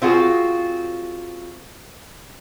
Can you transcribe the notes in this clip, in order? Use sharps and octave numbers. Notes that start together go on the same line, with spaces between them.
C4 F4 F#4 G#4